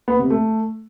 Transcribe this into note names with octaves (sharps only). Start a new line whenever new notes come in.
B3
C3
A3